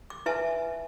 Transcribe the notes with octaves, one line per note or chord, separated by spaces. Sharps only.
D6
E4 B4 E5 G#5 A5